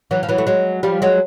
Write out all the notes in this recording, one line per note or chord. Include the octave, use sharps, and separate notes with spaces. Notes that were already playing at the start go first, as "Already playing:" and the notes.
E3 F#3
F3
E3 F#3
A3
F#3 G#3
F3 G3
F#3 G#3